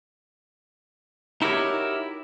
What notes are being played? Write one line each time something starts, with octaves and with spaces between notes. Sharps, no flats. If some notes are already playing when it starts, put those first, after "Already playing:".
D#4 E4 F#4 G4 A#4 C#5